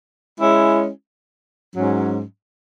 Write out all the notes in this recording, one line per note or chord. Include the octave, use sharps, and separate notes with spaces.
G#3 C#4 E4
G#2 F#3 C#4